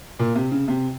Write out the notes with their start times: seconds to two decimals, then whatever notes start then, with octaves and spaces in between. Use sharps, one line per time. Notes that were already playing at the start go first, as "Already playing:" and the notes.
0.19 A#2
0.35 C3
0.51 C#3
0.68 C3